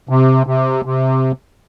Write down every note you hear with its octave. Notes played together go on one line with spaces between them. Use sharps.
C3
C3
C3